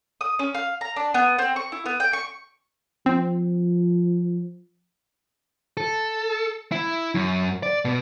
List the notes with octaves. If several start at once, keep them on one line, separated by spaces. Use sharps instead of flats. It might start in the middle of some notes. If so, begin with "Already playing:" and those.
D#6
C#4
F5
A#5
D4
B3
C4
C#6
E4
B3
G5
C#6
F3 C4
A4
E4
F#2
D5
B2